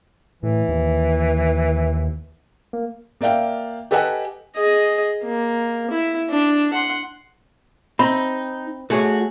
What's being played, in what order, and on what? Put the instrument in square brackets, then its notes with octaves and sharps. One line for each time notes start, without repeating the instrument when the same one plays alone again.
[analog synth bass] A2 [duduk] E3
[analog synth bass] D#2
A#3
[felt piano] A#3 D5 E5 F5 G5
G4 A4 B4 D#5 F#5 G#5
[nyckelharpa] G#4 D#5
A#3
E4
D4
F#5 C6
[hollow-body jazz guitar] C4 [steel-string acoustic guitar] D#4 [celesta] B5
[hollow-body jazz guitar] A3 G#4 C#5 [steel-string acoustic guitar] F#4